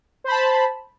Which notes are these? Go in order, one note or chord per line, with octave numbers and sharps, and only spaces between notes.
C5 A5 B5